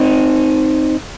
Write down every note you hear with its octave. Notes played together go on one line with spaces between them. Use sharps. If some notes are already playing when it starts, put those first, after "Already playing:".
Already playing: C4 D#4